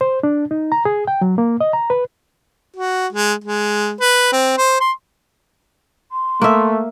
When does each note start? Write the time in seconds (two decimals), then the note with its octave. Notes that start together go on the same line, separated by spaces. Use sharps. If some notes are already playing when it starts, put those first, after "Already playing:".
0.01 C5
0.23 D4
0.51 D#4
0.72 A#5
0.85 G#4
1.07 G5
1.21 F#3
1.38 A#3
1.61 D#5
1.73 A#5
1.90 B4
2.76 F#4
3.13 G#3
3.44 G#3
4.00 B4
4.33 C4
4.58 C5
4.81 C6
6.12 C6
6.42 A3 A#3 E5